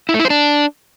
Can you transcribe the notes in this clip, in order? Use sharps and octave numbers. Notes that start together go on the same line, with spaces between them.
E4
A3
E4
C5
D4